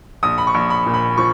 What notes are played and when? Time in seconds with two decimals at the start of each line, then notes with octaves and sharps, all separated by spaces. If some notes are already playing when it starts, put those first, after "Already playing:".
0.23 A#1 D#6
0.38 B5
0.47 C#6
0.55 A#1
0.70 B5
0.86 A#2
0.94 B5
1.18 F3 C#6